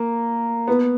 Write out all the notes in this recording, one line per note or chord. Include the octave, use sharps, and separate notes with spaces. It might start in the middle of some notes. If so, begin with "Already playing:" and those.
Already playing: A#3
B3